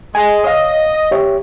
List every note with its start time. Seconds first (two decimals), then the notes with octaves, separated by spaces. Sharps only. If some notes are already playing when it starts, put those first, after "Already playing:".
0.15 G#3 G#5
0.44 C#5 D#5 F5
1.11 G4 C#5 E5